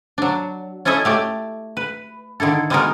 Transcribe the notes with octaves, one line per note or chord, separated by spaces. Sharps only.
F#3 D4
C#4 E4 A4 D#5 E5
A3 G4 D5
B4
D3 D#3 E4 A4
G3 G#3 B3 D#4 F#4 A#4